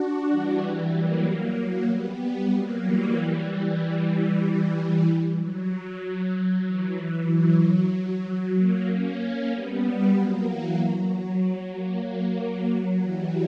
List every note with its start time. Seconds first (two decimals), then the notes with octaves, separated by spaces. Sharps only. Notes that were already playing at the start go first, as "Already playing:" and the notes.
Already playing: D4 F#4
0.29 E3 G3
0.93 F#3 A#3
1.25 F#3 A#3
1.88 G3 B3
2.52 F#3 A#3
2.83 E3 G3
3.48 E3 G3
3.79 E3 G3
4.43 E3 G3
5.37 F#3
6.33 F#3
6.65 E3
7.29 F#3
7.92 F#3
8.56 F#3 A#3
8.87 A#3 C#4
9.52 G3 B3
10.14 F#3 A#3
10.47 E3
10.78 F#3
11.42 F#3
11.73 F#3 A#3
12.37 F#3
13.00 E3 G3